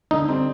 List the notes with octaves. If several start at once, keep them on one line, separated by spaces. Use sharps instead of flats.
D3 D#4
G3 C4